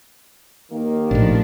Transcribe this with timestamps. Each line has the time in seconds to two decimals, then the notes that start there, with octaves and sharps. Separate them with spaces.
0.71 D#2 D#3 A#3
1.11 A#1 A2 F3 D4